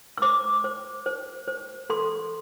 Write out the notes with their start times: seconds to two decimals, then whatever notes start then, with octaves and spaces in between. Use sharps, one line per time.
0.18 E6
0.22 C5 D6
0.64 C5
1.06 C5
1.48 C5
1.90 A4 C6